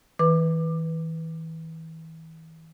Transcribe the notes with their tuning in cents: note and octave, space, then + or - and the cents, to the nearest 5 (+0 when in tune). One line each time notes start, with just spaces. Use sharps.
E3 -35 B4 +0 D6 +20